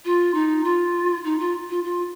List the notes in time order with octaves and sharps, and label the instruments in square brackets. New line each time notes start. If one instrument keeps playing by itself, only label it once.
[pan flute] F4
D#4
F4
D#4
F4
F4
F4